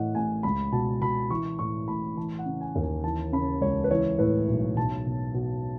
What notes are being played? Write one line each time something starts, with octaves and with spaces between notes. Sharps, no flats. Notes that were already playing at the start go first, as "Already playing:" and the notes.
Already playing: A2 E3 D#5 F#5
A1 G#5
C#2 B5
B2 A5
B2 B5
E3 C#6
A2 C#6
A1 B5
E3 A5
F#5
C#3
G#5
D#2
G#5
E3 A5
C#3 B5
C#2 C#5
B4
E3 C#5
A2 B4
B1
B1 A5
B2
B2